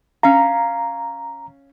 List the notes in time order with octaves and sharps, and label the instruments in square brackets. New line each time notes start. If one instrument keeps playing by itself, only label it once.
[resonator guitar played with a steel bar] C#4 F5 [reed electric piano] A#5